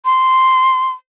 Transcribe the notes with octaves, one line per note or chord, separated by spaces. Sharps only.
C6